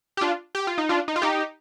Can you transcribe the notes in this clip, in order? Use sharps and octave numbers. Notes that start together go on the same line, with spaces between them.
G4
D4 F4
G4
F4
D#4
D4 F4
D#4
F4
D#4 G4